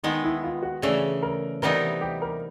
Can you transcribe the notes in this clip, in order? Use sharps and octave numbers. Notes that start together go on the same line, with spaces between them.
D#3 G#3 B3 D#4
E4
F4
F#4
C#3 E3 A3 D4 G#4
A#4
C3 E3 G3 B3 D#4 A#4
G4
A#4